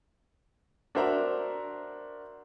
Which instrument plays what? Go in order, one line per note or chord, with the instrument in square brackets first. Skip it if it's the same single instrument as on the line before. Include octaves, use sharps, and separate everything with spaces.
[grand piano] D4 F#4 A#4 C5 E5 A#5